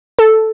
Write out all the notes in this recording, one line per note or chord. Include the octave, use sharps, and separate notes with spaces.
A4